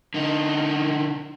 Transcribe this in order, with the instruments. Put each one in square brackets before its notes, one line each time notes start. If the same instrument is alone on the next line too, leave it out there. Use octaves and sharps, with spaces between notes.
[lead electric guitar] D3 D#4